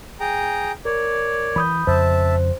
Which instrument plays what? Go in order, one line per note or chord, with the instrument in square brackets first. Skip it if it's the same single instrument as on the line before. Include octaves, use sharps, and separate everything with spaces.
[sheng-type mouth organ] G#4 G5 A#5
[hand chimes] A#4 [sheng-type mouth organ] C#5 D5
[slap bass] E3 [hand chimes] B5 D#6 G6
[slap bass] F2 C#3 [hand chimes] C5 [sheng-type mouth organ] E5 A5